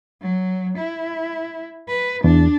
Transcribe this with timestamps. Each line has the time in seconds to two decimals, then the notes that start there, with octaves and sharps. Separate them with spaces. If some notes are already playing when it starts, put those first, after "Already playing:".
0.22 F#3
0.78 E4
1.88 B4
2.24 E2 D4